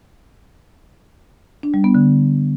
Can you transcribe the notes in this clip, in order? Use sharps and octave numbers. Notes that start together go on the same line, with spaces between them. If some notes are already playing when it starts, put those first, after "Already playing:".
D4
G3
B3
D3